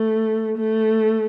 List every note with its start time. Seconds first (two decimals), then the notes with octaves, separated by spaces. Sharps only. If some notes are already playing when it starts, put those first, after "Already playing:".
Already playing: A3
0.58 A3